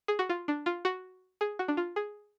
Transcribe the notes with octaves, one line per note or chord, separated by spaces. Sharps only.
G#4
F#4
F4
D4
F4
F#4
G#4
F#4
D4
F4
G#4